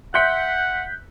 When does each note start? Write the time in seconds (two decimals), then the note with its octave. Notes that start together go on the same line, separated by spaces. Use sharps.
0.14 E5 F#5 C6 F#6 G6 B6 C#7